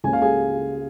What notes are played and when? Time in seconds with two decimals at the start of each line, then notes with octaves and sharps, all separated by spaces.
0.04 C#2 C#3 A#3 G#5
0.13 F5
0.22 G#4 G#5